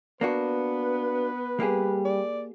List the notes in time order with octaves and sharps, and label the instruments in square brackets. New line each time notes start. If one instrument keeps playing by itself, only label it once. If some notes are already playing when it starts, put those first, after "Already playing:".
[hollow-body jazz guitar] A#3 D4 F#4 [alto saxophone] B3 [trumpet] B4
[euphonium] G3 [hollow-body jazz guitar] A#3 G4 G#4
[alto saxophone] D5